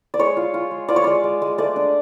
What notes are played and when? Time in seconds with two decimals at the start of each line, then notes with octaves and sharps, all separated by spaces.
0.14 D5
0.19 G#3 C#5
0.37 F4
0.54 F4
0.71 G#3
0.88 F4 D5
0.96 C#5
1.04 G#3 D5
1.24 G#3
1.42 G#3
1.58 A3 D5
1.76 D4